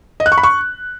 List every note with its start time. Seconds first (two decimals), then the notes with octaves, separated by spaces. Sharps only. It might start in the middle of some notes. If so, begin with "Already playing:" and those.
0.20 D#5
0.26 F#6
0.32 C#6
0.38 B5
0.43 C#6